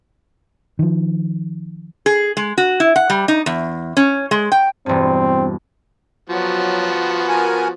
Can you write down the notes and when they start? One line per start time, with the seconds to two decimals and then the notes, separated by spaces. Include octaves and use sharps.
0.79 D#3 F3
2.06 G#4
2.37 G#3
2.58 F#4
2.80 E4
2.96 F#5
3.10 G3
3.28 D#4
3.46 E2
3.97 C#4
4.31 G#3
4.52 G5
4.86 E1 G2 C4
6.30 F3 F#3 B3 F#4
7.28 A#4 G#5